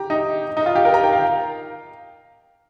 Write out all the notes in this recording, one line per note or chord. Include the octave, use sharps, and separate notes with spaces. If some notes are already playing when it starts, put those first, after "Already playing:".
Already playing: G4 A#5
D#4
D#4
F4
G4
A#4
A#5
G5
F5